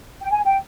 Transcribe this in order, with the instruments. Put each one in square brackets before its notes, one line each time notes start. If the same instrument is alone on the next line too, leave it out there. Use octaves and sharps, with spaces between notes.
[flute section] G5
G#5
G5